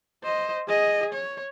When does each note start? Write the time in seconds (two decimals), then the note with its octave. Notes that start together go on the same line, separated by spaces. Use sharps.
0.24 C5 D#5
0.68 G#4 D#5
1.13 C#5